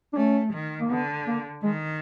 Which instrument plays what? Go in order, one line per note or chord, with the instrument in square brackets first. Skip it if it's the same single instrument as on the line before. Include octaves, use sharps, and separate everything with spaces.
[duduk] D4
[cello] A3 [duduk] C#4
[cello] D#3
[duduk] A#3
[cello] D3 [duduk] B3
[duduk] A#3
[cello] D#3 [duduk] G#3